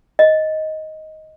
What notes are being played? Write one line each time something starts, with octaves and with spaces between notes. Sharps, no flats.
D#5